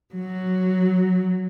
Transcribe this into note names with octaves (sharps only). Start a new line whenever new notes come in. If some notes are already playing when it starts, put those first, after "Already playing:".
F#3